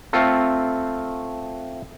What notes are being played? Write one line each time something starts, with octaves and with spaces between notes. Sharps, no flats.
A3 C4 F4 A4